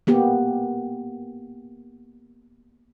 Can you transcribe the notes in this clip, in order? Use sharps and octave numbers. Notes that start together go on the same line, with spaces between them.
A#3 B3 G4